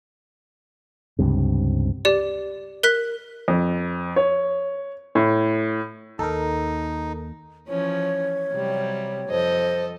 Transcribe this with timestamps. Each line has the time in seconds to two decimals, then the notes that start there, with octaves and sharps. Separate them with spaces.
1.19 C#2 G2 C3
2.05 G4 D5
2.83 A#4 F#6 B6
3.48 F2
4.16 C#5
5.15 A2
6.19 D#2 D#4 A4 A#4
7.68 E3 F3 C#4 C#5
8.52 C3 F#3 G3
9.29 F2 A4 C5 D#5